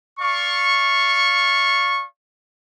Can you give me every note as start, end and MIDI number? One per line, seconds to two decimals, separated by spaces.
0.19 2.04 74
0.19 2.04 77
0.19 2.04 85